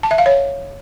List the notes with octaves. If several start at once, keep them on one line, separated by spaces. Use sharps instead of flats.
A5
E5
F5
C#5